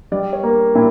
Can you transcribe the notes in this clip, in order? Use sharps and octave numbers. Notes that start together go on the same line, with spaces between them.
G3 D5
C#5
A#3
A#2 E4